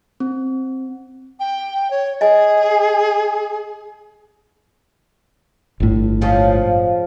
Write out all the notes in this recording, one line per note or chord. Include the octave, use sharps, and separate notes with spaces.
C4
G5
C#5
G#4 D#5 G#5
G1 A2
C#3 F3 G#3